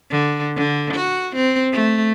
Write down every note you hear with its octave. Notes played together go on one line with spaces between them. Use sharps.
D3
D3
F#4
C4
A3